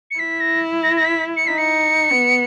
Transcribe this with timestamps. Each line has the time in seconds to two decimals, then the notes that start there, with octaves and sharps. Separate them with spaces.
0.11 C#7
0.19 E4 B6
0.40 A#6
0.83 A#6
0.96 A#6
1.05 B6
1.37 C#7
1.47 D#4 B6
1.58 C#7
2.12 B3